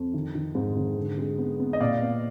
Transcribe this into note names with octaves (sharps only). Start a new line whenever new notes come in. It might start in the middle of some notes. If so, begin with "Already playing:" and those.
Already playing: F2
D#3
D#3
G#2
D#3
D3
G#3
B3
B3
D#5
A#2 D5 F5
B3